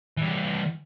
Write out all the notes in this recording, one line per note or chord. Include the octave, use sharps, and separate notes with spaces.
E3 G3